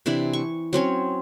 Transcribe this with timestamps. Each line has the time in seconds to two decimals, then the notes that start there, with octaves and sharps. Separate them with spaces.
0.06 C3 E3 D4 E4
0.33 C#6
0.73 F#3 C4 C#4 C#5